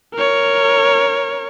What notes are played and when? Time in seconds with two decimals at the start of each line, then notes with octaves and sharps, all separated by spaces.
0.14 A#4 C#5